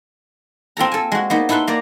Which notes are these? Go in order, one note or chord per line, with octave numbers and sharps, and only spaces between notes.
C4 F4 A4 A#5
A4 G#5
G#3 F#4
A#3 B3 D#4
D#4 E4 A4 B4 C6
A#3 D5 A#5